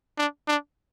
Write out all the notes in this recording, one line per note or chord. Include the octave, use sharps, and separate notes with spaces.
D4
D4